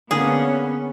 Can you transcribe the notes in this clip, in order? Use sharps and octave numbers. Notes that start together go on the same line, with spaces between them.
D3 A#3 B3 C#4 G#4 D5